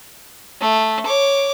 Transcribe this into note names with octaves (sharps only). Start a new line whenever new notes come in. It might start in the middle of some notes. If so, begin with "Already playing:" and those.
A3
C#5 D6